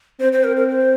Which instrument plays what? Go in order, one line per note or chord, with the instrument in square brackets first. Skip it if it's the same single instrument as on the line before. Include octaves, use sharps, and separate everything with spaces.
[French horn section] C4 [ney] C5
[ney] C5
A#4
A#4
C5